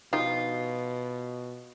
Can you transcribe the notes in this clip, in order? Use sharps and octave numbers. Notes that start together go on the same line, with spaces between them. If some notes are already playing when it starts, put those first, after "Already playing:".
B2 F3 D#4 F4 G4